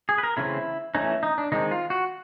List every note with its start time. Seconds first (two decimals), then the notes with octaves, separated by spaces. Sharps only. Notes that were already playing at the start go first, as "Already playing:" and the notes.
0.09 G#4
0.18 B4
0.23 A#4
0.37 C#3 E3 A3 C4 E4
0.95 E3 A3 C#4 D#4
1.23 D#4
1.38 D4
1.52 D#3 G#3 C4 D#4
1.71 F4
1.90 F#4